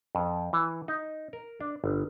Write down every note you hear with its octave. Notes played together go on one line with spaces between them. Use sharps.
F2
E3
D#4
A#4
D4
G1